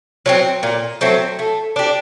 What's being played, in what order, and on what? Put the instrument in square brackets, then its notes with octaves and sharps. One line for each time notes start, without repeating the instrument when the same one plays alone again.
[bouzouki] F#3 A3 C4
A#2
F#3 A3 C4
A3
D4 G4